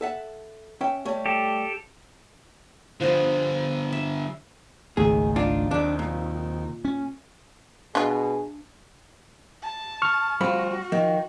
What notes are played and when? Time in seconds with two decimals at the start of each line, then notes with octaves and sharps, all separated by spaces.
0.01 A4 E5 F#5
0.81 C#4 E5 G5
1.05 G3 A3 C#5
1.26 G4 A4
3.00 D3 F3 G3 C5 D#5
3.93 E5
4.97 G#1 C#2 D#3 A3 G#4
5.36 D4 F4
5.71 D#2 C3 D4
5.99 A#2
6.85 C#4
7.95 B2 G#3 D4 F4 G#4
9.62 A5
10.02 C#6 F6
10.41 D2 F3 G3 C4 F#4 B5
10.92 D#3 F3